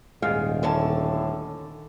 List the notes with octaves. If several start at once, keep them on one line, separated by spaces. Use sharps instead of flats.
D#1 G#2 D#3 G#4 F5
A2 D3 C#4 A5